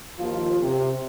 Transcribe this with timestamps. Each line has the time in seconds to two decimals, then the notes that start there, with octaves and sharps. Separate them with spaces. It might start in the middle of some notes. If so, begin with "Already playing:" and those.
0.19 D#2 F3 F4
0.60 C3